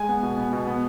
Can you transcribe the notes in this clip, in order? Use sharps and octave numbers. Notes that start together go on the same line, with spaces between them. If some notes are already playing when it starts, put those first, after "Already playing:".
Already playing: G#3 G#5
B3
B2
B3
B2
B3